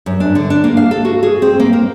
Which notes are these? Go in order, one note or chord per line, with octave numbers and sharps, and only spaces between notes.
F#2
D4
D3
D4
A#3
F5
A4
F#4
G#4
C4
A#3
A#4